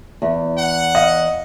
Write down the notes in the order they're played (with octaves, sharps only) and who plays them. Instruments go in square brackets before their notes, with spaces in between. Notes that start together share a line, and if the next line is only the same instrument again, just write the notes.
[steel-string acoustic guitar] E2
[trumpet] F#5
[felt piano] D#5 F5